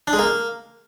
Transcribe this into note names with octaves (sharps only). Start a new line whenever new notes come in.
D4
G#3
A#3